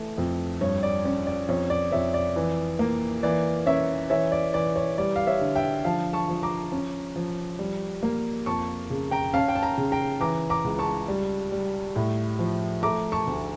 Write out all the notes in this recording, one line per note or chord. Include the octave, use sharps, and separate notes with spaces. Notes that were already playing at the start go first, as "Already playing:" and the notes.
Already playing: E3 A3
F2
G2 C#5
D5
C#4 C#5
D5
F2 C#5
D5
F2 C#5 E5
D5
E3
A#3
E3 D5
C#4 C#5 E5
E3 C#5 E5
D5
E3 D5
C#5
G3 D5
F5
C#5 E5
D3
E5 G5
F3 F5 A5
A5 C#6
F3
A#5 D6
C#4
F3
G3
A#3
F2 A5 C#6
C#3
G5 A#5
C#4 F5 A5
G5
A5
G5 A#5
C#3
G5 A#5
E3 A#5 D6
A#5 D6
C#2
A5 C#6
G3
G3
A2
F3
A3 A#5 D6
A5 C#6
D2